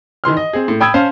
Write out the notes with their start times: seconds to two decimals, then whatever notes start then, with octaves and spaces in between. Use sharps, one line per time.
0.24 D#3 E3 C6 F6
0.37 D#5
0.53 C4 G#4
0.68 A2
0.81 G5 B5 D#6 E6 G#6
0.94 C#4 C5 F5 A5